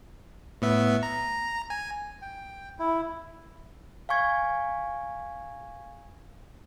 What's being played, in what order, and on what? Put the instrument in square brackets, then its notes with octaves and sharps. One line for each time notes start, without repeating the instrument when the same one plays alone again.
[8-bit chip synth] A2 B3 E5
A#5
G#5
[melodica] G5
E4
[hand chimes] F5 G#5 C#6 G#6